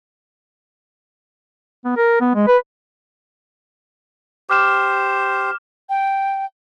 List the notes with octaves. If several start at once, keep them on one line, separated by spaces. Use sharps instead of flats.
B3
A#4
B3
G#3
B4
G4 C5 D6 F6 E7
G5